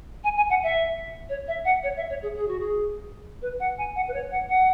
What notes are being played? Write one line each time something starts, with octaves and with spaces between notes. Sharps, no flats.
G#5
G#5
F#5
E5
C#5
E5
F#5
C#5
E5
C#5
G#4
G#4
F#4
G#4
B4
F#5
G#5
F#5
B4
C#5
F#5
F#5